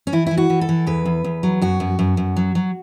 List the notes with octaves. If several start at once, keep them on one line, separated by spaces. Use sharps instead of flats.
C#4
E3 E4
E3 E4
F#4
E3
A4
E3
E2 B4
E2
E2
F#3
F#2 F#4
F#2
F#2
F#2
F#3
F#3